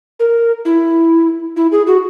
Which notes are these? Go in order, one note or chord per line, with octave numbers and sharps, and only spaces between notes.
A#4
E4
E4
G#4
F#4